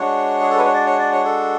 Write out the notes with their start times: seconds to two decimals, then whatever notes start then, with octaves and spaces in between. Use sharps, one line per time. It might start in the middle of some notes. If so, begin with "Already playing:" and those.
Already playing: G#3 D4 F#4 C#5
0.41 G#4
0.50 A4
0.57 B4
0.65 C#5
0.74 D5
0.86 C#5
0.99 D5
1.12 C#5
1.24 A4